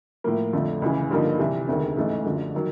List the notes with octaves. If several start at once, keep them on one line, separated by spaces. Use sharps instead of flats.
A2 F3 A#3
F2 D3 F3 A3
C#2 C#3 E3
G2 D3 F3 A#3 D#4
C2 C3 E3
E1 D2 C3 D#3
A1 G#2 E3 A3
F#2 D3 F3
D#3 F#3